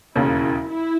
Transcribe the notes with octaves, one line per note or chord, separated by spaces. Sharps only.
E1 D#2 C#3 E4
E4